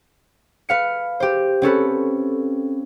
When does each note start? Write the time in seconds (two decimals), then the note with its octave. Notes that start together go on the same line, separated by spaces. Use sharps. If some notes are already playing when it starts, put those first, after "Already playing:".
0.69 B4 F5 C#7
1.20 G4 C5
1.62 C4 C#4 A4 B4